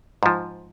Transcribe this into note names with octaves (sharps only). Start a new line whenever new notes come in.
G#2 F3